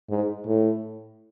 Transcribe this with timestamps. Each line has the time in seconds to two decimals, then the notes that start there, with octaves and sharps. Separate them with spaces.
0.10 G#2
0.47 A2